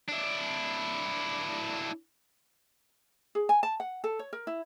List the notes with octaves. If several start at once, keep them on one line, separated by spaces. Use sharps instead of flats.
D4 E4
G#4
G#5
A5
F#5
A4
C#5
A#4
E4